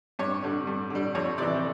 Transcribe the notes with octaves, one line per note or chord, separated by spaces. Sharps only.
G2 C#5
D3 G3
G2
D3 G3
F2 C#5
C3 E3 D5